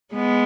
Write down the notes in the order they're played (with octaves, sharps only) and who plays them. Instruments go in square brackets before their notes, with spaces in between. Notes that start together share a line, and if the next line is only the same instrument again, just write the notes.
[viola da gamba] G#3 B3